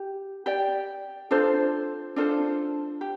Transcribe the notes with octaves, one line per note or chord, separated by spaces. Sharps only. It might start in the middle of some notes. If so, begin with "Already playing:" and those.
Already playing: G4
G4 D5 G5
D4 F4 A4 C5
D4 F4 A4 C5
G4